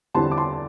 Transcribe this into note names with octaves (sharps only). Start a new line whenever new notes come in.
E2 D3 G3 C4 A5 C6
D6
A5 C6